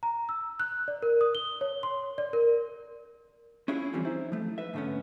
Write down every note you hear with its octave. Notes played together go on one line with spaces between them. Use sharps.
A#5
E6
F#6
D5
A#4
D#6
G7
C#5
C6
D5
A#4
C#4 D4 E4 F4 G#4 C#5
D3 E3 F3 G3 C4 G4
D#4 E4 C5
F3 A3
B4 E5
G#2 D3 A3 B3 C#4